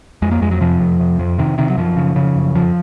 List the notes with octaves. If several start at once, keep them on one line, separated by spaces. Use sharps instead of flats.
F2 G#3
A#3
F2 G#3
F#3
C3 F3
F2
C3
F2
C3 D#3
C3 D#3
F#3
F#2 F3
C#3
C#3
F#2
F2 F3